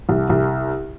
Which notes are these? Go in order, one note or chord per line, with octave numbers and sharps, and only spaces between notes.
C2
C2